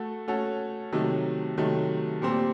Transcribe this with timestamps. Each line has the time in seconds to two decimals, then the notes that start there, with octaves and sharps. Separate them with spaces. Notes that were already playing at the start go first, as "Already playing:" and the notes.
Already playing: A3 F#4 A4
0.28 A3 C#4 F#4 A4
0.92 C3 D#3 F#3 A3
1.57 C3 D#3 F#3 A3
2.22 A#2 G3 C4